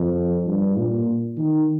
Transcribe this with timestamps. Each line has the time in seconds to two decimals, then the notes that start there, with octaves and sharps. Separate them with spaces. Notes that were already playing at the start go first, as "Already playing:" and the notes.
Already playing: F2
0.47 G2
0.77 A#2
1.38 D#3